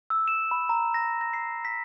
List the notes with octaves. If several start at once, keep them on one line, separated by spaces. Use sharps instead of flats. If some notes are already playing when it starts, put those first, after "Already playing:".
E6
E7
B5
A#5
A#6
A#6
C7
B6